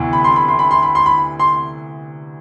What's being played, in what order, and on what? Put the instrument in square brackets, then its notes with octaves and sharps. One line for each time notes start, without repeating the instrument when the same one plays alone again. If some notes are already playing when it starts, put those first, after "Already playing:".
Already playing: [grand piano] D2 C3 E3 B3
B5
C6
B5
C6
B5
C6
B5
C6
B5
C6